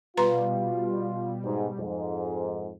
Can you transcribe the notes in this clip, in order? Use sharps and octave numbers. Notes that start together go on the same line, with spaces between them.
B2 G3 F4 B4 A#5 C6
G#2
F2 G#2